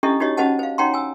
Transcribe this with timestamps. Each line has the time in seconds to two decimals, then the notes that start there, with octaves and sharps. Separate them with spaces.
0.03 C#4 D4 E4 G4 A4 D#5
0.20 D#4 F#4 G4 C#5 D#5
0.37 C#4 F#4 C5 D#5 F#5 A5
0.59 C5 F5
0.78 D#4 C#5 F#5 G5 A#5 C6
0.94 G#5 E6